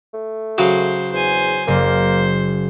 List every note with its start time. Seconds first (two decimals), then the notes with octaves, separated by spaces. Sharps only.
0.13 A3
0.58 C#3 F#3 F#4 C5
1.12 E2 C5 G#5
1.68 F#1 A#3 C5